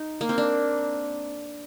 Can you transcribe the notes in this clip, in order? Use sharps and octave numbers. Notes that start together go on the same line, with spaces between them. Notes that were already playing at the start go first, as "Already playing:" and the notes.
Already playing: D#4
A#3
C4
D4